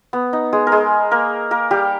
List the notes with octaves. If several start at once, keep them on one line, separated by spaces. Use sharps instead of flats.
B3
D#4
G#3 G#4
A#4
G#3 G#4
A#3 A#4
A#3 A#4
G3 G4